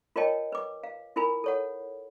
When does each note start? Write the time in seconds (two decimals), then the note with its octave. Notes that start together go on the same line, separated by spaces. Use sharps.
0.16 F4 A#4 C#5 D#5 G5 A5
0.52 B4 D6
0.84 F5
1.16 E4 F4 A#4 G#5 B5
1.44 A4 C#5 F#5